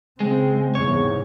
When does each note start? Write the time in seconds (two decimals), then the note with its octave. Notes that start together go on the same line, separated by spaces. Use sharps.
0.20 C#3 G#3 C4
0.75 E2 G#2 C3 C#5